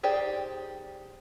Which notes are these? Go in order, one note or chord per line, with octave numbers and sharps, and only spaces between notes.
D#4 G4 G#4 C5 D5